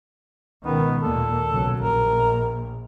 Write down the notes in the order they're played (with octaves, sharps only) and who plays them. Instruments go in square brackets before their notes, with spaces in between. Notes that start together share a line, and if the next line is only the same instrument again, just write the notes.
[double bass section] C#2 B2 D#3 [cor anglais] B3
[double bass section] D#2 A#2 A#3 [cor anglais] A4
[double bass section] B1 C#3 F#3
[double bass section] A#1 [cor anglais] A#4